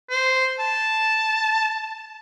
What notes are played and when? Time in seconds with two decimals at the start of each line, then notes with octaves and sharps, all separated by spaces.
0.10 C5
0.59 A5